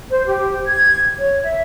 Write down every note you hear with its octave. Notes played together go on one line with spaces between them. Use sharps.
C5
G4
G#6
C#5
E5